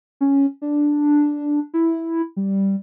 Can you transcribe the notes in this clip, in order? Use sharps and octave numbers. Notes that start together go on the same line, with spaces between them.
C#4
D4
E4
G3